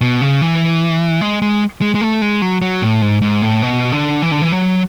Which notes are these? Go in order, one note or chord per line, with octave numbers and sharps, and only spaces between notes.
B2
C#3
E3
G#3
G#3
G#3
G#3
A3
G#3
F#3
F#3
A2
G#2
G#2
A2
B2
D3
E3
D3
E3
F#3